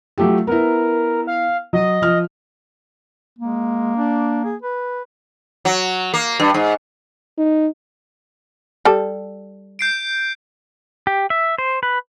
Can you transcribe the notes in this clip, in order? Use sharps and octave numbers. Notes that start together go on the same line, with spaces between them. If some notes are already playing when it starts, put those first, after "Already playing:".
F#3 A3 F4 G4
B3 E4 A#4
F5
F#3 D#5
F3 F6
G#3 A#3
D4
G#4
B4
F#3
A#3
G2
G#2
D#4
G3 A4
G6 C7 D7
G4
E5
C5
B4